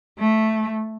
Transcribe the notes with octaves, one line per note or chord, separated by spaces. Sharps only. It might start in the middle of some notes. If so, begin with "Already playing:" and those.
A3